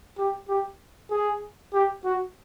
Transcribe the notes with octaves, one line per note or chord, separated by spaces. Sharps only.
G4
G4
G#4
G4
F#4